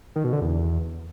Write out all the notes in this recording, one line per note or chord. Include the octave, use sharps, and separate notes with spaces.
D#3
B2
D3
E2